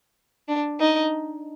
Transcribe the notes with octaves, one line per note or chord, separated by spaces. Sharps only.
D4
D#4